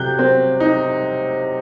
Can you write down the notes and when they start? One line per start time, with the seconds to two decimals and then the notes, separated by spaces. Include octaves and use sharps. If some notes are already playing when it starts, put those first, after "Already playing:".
Already playing: C3 F#3 F#6 G6
0.19 C4
0.60 D#4